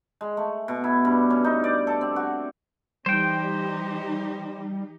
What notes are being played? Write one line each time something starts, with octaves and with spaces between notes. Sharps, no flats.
G#3
A3
B2
E4
G2
C#4
D#4
D5
A4
C4
F#4
E3 G3 D#4 G4 C5 G5